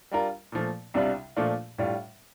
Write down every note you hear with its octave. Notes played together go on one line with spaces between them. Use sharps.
G3 D4 F4 A#4
A#2 F3 A3
C2 C3 G3 D4 F4
A#2 F3 A3 D4 F4
A2 G3 D4 F4